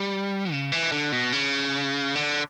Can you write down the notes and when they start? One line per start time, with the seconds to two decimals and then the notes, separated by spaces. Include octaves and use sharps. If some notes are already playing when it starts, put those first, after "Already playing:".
Already playing: G3
0.52 C#3
0.72 E3
0.92 D3
1.12 B2
1.33 C#3
2.15 D3